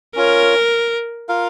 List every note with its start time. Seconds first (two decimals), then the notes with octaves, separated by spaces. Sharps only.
0.16 C#4 F4 A#4 C#5
1.29 F4 A#4 F5